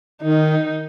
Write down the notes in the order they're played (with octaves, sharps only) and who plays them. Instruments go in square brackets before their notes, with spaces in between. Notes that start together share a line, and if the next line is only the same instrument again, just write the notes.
[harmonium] D#3 [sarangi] D#4